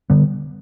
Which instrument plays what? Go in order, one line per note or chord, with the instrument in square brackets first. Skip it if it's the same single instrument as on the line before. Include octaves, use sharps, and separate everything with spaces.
[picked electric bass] D3 G3 B3